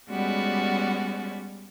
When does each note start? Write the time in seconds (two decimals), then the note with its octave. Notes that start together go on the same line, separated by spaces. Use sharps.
0.10 G3 G#3 B3 C#4 F#4 D5